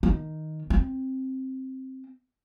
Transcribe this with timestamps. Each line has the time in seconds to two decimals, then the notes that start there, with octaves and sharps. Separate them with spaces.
0.03 D#3
0.70 C4